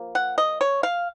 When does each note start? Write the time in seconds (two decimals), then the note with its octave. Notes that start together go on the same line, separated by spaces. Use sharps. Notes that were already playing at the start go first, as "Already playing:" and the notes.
Already playing: F3 A#3
0.15 F#5
0.38 D#5
0.61 C#5
0.83 F5